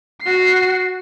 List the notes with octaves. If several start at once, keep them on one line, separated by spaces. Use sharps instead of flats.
F#4 C7